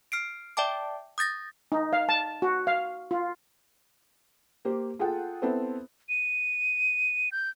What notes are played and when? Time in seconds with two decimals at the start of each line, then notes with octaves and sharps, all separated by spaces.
0.12 F6 C7 D7
0.57 D5 E5 G5 A5 D6
1.18 D#6 G6 A6 A#6
1.72 D#4
1.93 F5
2.09 A5
2.42 F#4
2.67 F5
3.11 F4
4.65 A#3 G4 C5
4.99 F4 G#4 A4 F#5 G5
5.42 B3 C4 E4 A4 C5
6.09 D#7
7.32 G6